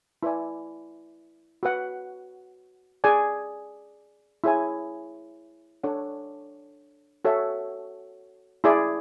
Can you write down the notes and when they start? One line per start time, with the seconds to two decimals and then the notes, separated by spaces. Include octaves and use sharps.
0.23 E4 B4 D5 G#5
1.63 F#4 B4 F#5
3.04 G#4 D5 G#5
4.44 E4 G#4 C#5 G#5
5.83 D4 A4 C#5 F#5
7.25 F#4 A4 C#5 E5
8.64 E4 G#4 D5